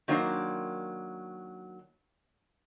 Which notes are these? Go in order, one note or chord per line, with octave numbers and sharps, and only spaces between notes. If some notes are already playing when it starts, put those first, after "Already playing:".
D#3 F#3 A#3 D4 C5